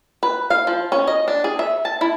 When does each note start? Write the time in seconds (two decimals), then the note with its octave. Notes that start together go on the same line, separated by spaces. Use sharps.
0.23 B4
0.50 F5
0.67 F3
0.92 C#4
1.07 D#5
1.28 D4
1.44 G#4
1.59 E5
1.85 A5
2.01 E4